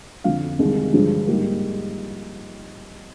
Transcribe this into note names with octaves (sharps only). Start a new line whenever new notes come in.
F2 D3 F3 F5
C2 C3 D#3 G#3
G2 D3 F3 G#3
G#2 G3 A#3